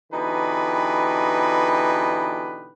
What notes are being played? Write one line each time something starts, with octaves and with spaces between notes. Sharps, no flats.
B2 D3 E3 D#4 G4 B4